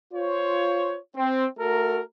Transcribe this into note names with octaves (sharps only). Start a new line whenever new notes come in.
F4 C5 C#5
C4
A3 F#4 A4 A#4